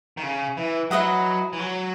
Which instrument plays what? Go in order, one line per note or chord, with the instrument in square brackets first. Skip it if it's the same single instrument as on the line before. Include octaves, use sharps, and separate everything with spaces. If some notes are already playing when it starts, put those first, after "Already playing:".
[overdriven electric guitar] D#3
C#3
E3
[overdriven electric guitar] F#3 [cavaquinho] E4 B4 D#5 F#5
[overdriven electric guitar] E3
F#3